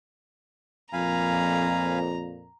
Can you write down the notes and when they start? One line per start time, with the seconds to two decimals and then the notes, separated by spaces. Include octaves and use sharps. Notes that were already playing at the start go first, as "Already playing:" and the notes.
0.93 F2 A#2 F5 G#5 A#5 B5